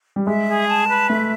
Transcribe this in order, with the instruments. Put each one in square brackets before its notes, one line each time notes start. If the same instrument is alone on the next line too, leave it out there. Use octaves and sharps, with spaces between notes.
[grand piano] G3
[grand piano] G#3 [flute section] E5
[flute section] G#4
A5
B4
[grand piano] A3 [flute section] E5